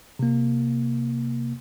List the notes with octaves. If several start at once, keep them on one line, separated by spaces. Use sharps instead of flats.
C3 A#3